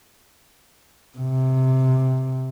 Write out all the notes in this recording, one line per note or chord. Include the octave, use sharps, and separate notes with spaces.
C3